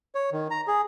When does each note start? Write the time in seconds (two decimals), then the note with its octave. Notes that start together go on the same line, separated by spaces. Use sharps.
0.15 C#5
0.32 D#3
0.51 A#5
0.67 G#4